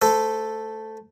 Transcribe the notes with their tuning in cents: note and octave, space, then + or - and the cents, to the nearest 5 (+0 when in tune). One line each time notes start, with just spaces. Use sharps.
A3 +0 A4 +0 C5 -20